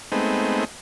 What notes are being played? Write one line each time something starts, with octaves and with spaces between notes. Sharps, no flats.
G#3 A3 B3 C4 D#4